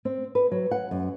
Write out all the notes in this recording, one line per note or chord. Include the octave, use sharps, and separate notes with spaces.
C4
B4
F#3
F#5
F#2